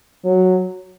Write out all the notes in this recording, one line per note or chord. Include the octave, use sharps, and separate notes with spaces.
F#3